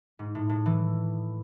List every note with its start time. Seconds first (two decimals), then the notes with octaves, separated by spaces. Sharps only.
0.19 G#2
0.35 A2
0.49 A2
0.66 E3